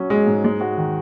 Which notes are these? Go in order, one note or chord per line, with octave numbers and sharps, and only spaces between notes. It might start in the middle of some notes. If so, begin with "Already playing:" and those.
Already playing: F#3 C#4
G#3 G#4
G#2
G#3
F#4
D#3